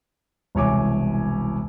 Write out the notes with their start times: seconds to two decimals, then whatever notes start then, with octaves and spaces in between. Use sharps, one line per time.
0.55 E1 C2 C#5 G#5 D6